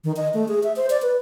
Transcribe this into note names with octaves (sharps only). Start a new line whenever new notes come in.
D#3
D#5
A3
G#4
E5
C5
D5
B4